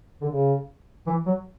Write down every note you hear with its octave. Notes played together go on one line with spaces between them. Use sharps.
D3
C#3
E3
F#3